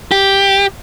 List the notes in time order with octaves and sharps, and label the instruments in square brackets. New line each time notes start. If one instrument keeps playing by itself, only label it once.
[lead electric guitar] G4